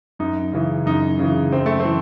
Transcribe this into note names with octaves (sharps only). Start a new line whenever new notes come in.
F#2 D#4
C#3 E3
F#2 D#4
C#3 E3
F#2 C4
A3
C4
E3